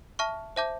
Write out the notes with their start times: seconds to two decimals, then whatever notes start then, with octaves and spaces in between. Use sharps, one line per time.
0.19 E5 A5 C#6 F6
0.56 C5 E5 A5 D6 G6